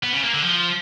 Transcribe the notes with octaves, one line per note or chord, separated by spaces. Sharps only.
B3
C#3
A#3
D3
F3